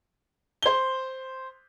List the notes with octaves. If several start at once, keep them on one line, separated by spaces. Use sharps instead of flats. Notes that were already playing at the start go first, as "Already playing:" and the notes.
C5 G7